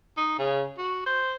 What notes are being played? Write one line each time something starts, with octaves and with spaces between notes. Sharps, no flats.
D#4
C#3
F#4
C5